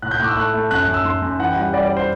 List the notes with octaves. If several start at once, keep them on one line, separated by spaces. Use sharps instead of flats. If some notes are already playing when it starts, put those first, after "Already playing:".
A2 F#6
G6
A2 D6 F#6
E6
A3 F#6
A3
F#2 F#6
F#6
F#2
E6
F#2 C6
F#2
E3 F#5
G5
G3 F#5
G3 D5
D5
C5